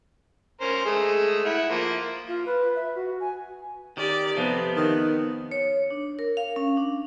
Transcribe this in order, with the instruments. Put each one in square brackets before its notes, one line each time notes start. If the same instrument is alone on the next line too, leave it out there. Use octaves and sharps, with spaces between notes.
[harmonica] C#4 A#4 C5
G#3 A3 G#4
E4 F#5
F3 A#3
[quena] F4
B4
E5
F#4
G#5
[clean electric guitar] D#3 [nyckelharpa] G4 D5
[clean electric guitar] F2 C3 F3 [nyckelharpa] B3
[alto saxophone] D#3
[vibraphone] C#5
D4
A#4
F5
C#4
D4